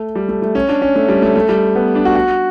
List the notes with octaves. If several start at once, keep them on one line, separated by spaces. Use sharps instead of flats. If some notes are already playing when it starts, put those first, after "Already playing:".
Already playing: A3
G3
A3
A3
C#4
D4
C#4
A3
G3
A3
A3
G3
B3
D4
F#4
F#4